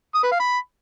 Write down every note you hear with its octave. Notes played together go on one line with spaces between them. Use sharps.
D#6
B4
F5
B5